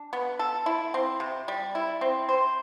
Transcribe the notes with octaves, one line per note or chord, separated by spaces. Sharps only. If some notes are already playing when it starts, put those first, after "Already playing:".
Already playing: D4
B3
A4
E4
C4
C3
G3
E4
C4
C5